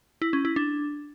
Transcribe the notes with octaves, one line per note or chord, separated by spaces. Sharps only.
E4
C#4
E4
D4